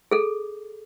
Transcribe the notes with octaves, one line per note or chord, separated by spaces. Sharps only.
G#4 A4